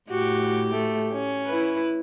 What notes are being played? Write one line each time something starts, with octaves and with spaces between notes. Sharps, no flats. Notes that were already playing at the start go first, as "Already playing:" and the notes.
A2 F#4 G4
A3
C#4
E4 B4